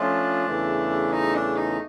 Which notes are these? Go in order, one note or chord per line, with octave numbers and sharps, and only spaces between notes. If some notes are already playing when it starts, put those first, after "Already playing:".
Already playing: F3 A3 C#4 D4 F4
E2 C#3 E3 A3
D#4
D4
D#4